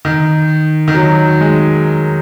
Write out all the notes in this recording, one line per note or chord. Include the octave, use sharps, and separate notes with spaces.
D#3
D#3
F#3
G#3